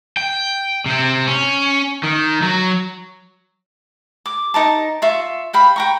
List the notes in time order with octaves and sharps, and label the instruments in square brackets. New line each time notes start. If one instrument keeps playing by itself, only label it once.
[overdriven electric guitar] G5
C3 C4
C#4
D#3
F#3
[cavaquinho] D6
D#4 A#4 A5
F4 E5 C#6
F5 G5 B5
G5 A#5 C#6